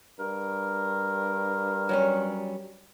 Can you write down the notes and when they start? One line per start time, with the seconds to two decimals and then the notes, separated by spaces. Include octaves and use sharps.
0.19 G2 A#4
1.89 F#3 G3 C#4